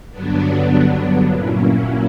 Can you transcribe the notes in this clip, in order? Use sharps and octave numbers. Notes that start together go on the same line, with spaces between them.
G2 D3 F#3 B3 D4
A#2 F#3 A#3 C#4 E4